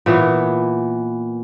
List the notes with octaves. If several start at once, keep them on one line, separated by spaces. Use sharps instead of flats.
A#2 E3 B3 C#5